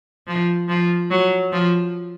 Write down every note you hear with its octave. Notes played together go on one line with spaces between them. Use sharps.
F3
F3
F#3
F3